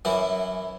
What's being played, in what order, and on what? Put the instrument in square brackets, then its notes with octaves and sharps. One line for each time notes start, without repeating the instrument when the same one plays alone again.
[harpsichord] F#2 E3 E4